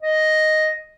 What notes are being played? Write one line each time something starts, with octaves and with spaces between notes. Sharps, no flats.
D#5